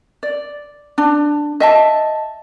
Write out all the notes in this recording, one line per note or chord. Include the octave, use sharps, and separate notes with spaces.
D5
D4
D#5 E5 A5